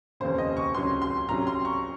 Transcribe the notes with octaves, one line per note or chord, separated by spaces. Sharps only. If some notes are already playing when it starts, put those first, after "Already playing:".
F1 D#2 C#3 C5
D#5
C#6
C#2 C3 F#3 C#4 C6
C6
C2 C3 F#3 C#4 A#5
C6
C#6